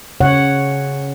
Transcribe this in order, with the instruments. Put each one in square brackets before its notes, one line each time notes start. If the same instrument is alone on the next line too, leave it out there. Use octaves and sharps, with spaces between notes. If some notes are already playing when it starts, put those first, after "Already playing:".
[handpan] C#3 C#5 F#5